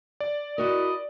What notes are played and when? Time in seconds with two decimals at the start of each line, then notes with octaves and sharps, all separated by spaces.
0.20 D5
0.58 E4 F#4 A#4 D#5